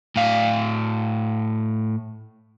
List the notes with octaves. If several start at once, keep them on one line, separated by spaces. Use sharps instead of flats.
A2 F5